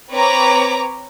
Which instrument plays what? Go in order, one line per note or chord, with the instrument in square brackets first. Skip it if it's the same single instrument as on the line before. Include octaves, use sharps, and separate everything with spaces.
[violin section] C4 B4 C#5 A#5 D6